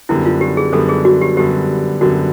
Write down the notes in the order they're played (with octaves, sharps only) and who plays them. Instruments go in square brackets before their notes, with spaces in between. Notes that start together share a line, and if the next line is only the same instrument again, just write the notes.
[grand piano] F#2 D3 G3 B3 [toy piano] E4
[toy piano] F4
G4
G#4
[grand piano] F#2 D3 G3 B3 [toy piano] A4
[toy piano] G#4
F#4
G4
[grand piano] F#2 D3 G3 B3 [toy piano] G4
[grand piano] F#2 D3 G3 B3 [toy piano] F#4